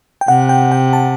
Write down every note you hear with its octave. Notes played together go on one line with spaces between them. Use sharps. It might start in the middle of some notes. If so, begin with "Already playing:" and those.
G5
C3 F#5
G5
G5
A5